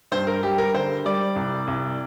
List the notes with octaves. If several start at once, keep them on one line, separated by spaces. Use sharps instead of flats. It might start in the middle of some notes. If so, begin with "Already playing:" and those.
G2 C5
A#4
G3 G4
A#4
D3 C5
G3 D5
C2
C2